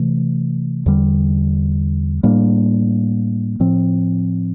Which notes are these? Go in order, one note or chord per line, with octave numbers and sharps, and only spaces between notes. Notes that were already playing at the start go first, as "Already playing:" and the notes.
Already playing: C3 E3 A3
E2 D3 G3
A2 G3 A#3 D4
A2 F3 C4